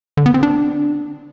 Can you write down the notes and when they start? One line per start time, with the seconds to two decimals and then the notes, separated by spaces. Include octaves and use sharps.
0.17 D3
0.26 B3
0.34 C4
0.43 D4